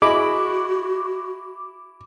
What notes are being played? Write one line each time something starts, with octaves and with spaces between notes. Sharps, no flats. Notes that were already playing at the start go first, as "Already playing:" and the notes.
E4 F#4 G#4 D#5 B5 D6